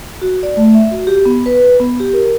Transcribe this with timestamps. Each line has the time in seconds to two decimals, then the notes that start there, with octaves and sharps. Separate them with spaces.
0.22 F#4
0.43 D5
0.57 A3
0.75 E5
0.91 F#4
1.07 G4
1.26 B3
1.46 B4
1.80 B3
2.00 G4
2.13 A#4